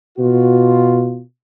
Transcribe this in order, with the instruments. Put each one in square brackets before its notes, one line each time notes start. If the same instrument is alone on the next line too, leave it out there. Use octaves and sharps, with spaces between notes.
[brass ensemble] B2 F4 F#4